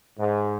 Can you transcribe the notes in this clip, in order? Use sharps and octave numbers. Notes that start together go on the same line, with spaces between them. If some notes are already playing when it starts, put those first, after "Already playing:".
G#2